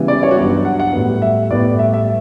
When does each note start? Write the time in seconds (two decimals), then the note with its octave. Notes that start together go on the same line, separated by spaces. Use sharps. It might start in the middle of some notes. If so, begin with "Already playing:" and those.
Already playing: C#3 E3 G3 B3
0.08 D5
0.23 C#5
0.31 F#4
0.37 G2 F#3 B3 G4
0.65 F#5
0.80 F#5
0.93 A2 G3 B3
1.22 E5
1.50 A2 G3 B3 D5
1.79 E5
1.94 E5